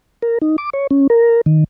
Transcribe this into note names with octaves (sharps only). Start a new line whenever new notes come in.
A#4
D#4
D6
C#5
C#4
A#4
D#3